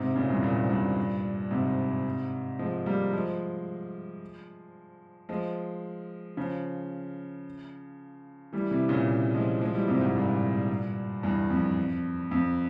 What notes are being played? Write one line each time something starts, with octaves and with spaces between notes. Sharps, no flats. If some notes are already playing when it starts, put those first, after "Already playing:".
Already playing: G#2 C3
A#2 C#3
E2 G2
A#2
G#2
G2 A#2
G#2 C3
F3 G#3
G3 A#3
F3 G#3
F3 G#3
C#3 F3
E3 G3
C3 E3
A#2 C#3
F3 G#3
F3 G#3
E3 G3
G#2 C3
G#2 C3
G2 A#2
E2 G2
F2
F2